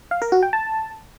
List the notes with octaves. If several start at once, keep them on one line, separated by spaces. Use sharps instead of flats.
F5
A#4
F#4
G5
A5